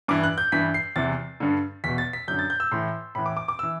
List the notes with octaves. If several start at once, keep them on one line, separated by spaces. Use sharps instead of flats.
G2 E3 D6
F#6
G6
G2 E3 B6
C7
E2 C3 E3 A6
G2 D3
E2 B2 B6
A6
B6
F#2 D3 G6
A6
G6
E6
A2 E3 C6
A2 E3 B5
D6
D6
D6
E3 E6